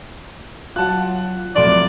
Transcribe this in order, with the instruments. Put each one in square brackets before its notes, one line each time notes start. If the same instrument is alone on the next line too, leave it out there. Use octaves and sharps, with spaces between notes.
[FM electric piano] F#3 F4 [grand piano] F#5 A5 F#6
[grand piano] C2 C6 D6 [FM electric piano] F3 F#3 A3 [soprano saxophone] D5